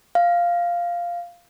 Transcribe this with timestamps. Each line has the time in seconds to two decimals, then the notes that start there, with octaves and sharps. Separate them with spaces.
0.15 F5